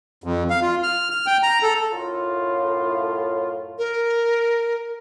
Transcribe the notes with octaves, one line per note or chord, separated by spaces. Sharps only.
F2
F5
F4
F6
F6
G5
A#5
A4
F#2 A2 F4
A#4